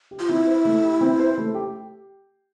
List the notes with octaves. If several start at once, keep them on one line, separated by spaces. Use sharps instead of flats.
G4
F4
C4 E4
C5
A3
G4
C4
C5
A3
G4